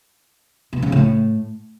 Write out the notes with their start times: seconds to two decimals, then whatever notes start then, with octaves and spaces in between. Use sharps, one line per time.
0.73 B2
0.82 C#3
0.92 A2